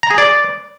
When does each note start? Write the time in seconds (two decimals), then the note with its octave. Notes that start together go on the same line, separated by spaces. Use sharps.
0.03 A#5
0.11 G#4
0.18 D5